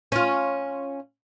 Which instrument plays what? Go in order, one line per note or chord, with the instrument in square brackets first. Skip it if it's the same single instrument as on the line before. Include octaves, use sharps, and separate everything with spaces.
[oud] C#4 F4